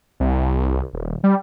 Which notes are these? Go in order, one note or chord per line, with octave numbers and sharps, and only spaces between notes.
C2
D#1
G3